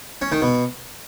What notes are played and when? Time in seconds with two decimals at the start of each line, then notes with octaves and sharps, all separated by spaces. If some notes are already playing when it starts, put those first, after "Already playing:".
0.22 C#4
0.32 D#3
0.42 B2